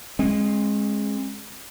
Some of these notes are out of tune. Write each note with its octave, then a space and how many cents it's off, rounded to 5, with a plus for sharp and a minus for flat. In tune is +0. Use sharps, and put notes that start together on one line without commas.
G#3 +0 C#4 -45